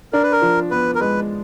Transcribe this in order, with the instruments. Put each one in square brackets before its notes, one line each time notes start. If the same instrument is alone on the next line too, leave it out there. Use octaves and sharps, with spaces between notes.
[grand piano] D4 [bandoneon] A#4
[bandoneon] B4
A#4
[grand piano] F3
[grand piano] B3 [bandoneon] B4
[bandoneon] A#4
[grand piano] G#3 [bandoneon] B4